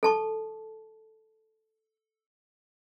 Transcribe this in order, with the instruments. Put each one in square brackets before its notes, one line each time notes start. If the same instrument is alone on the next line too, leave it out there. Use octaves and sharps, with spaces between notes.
[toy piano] A4 A5 C#6